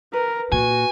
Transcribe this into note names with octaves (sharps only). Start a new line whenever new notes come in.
A#4 B4
A#2 F#4 G#5